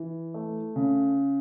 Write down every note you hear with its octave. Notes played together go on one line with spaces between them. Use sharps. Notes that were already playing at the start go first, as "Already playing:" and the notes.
Already playing: E3
A3
C#3